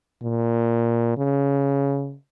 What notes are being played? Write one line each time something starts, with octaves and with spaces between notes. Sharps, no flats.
A#2
C#3